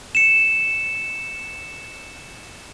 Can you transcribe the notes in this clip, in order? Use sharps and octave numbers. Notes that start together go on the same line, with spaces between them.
C#7 E7